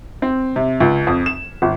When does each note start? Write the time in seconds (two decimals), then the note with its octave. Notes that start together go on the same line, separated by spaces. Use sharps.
0.22 C4
0.56 C3
0.80 C#2
1.07 F2
1.26 E7
1.62 G1